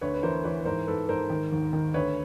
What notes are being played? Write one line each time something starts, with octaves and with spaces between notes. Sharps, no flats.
D2 B4 C#5
B4
E3 A#4 C5
E3 B4 C#5
B4
G#2 A#4 C5
G#2 A4 B4
G#2 A#4 C5
D#3
D#2
D#3
D2 B4 C#5